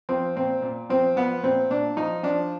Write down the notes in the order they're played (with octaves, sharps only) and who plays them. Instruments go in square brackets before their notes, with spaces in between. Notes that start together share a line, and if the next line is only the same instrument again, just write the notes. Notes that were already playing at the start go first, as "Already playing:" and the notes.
[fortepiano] F3 C4
A#2 C4
A#2
F3 C4
F3 B3
A#2 C4
A#2 D4
F3 D#4
F3 D4